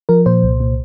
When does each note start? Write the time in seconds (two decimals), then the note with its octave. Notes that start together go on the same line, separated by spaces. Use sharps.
0.09 F3 A#4
0.26 A#2 C5
0.43 C2
0.60 A#2